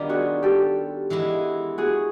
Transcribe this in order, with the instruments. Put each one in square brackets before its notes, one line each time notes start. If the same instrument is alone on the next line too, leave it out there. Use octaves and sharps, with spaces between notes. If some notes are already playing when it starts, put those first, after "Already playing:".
Already playing: [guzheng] D#3 G3 B3 D4 F4 [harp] A#4
[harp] F#4 G#4
G4 A4
[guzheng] E3 G#3 B3 E4
[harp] F#4 G#4